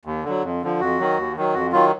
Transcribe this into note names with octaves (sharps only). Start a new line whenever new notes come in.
D#2
D3 F#3
F2
D3 F3
F2 F#4
D#3 F#3
D#2
D#3 F#3
F2 F#4
D#3 F#3 F4